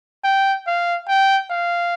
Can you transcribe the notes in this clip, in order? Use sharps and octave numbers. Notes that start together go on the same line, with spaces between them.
G5
F5
G5
F5